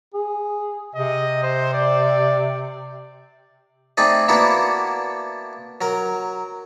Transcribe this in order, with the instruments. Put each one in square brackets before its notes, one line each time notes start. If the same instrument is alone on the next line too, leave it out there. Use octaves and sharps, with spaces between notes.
[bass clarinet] G#4
[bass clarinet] C3 [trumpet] D#5
[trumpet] C5
D5
[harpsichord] A3 C4 D#4 G#4 D5
A#3 B3 D4 E4 F#4 A#4
F#3 A#4